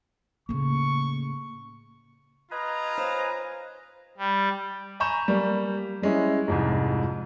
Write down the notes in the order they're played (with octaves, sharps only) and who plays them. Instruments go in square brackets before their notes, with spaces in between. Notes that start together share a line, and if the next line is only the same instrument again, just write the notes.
[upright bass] A2 C#3 [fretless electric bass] A#3 [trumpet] C#6
[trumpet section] F4 A#5 [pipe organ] B4 D#5 G#5
[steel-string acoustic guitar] C5 C#5 F5
[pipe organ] G3
[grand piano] G#5 A#5 B5 C#6 G6 E7
G3 A#3
G3 G#3 C#4 E4
C2 F2 G#2